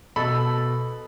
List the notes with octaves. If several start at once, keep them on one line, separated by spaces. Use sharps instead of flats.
B2 A4 B5